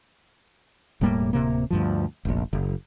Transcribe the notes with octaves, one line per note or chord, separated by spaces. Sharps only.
E1 A2 G3 A#3
D1 C3 A#3
D2 G2 F3
F1 A#1
F#1